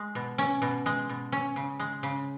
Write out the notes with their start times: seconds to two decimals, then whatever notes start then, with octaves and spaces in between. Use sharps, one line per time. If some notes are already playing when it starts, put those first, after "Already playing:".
Already playing: G#3
0.15 B2
0.38 C#4
0.62 B2
0.86 G#3
1.09 B2
1.32 C#4
1.56 C#3
1.80 G#3
2.03 C#3